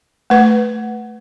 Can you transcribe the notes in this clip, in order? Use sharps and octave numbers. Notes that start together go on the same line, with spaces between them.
A3 B4